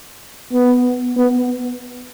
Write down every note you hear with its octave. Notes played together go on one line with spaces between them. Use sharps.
B3
B3